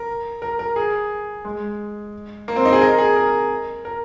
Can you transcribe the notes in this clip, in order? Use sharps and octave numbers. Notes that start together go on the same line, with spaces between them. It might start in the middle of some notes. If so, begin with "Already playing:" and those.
Already playing: A#4
A#4
A#4
G#4
G#3
A#3
C4
D#4
G#4
A#4
G#4
A#4
A#4